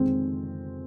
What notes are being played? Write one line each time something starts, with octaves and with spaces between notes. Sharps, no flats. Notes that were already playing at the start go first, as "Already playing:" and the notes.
Already playing: F2 D#3 G#3 C4